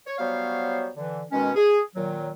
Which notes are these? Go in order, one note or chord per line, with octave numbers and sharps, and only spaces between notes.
C#5
F#3 G3 B3 C5 C#5 F5
D3 E3
B2 D#3 G#3 C#4
G#4
A#2 D#3 F#3